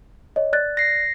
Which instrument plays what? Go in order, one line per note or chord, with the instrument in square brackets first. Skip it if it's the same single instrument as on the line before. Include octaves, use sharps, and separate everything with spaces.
[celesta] C#5 D#5
D5 F#6 A6
[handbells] A#6 C7